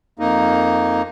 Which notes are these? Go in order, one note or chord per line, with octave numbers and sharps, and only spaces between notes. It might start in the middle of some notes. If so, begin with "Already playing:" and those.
F2 A#3 D#4